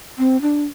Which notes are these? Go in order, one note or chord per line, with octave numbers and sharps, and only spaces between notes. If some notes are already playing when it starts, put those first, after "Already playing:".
C4
D4